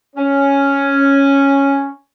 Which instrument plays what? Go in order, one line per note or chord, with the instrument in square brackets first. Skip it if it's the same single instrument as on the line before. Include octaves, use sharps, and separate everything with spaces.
[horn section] C#4